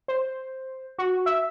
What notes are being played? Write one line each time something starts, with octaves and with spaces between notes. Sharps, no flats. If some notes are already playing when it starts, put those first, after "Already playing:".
C5
F#4
E5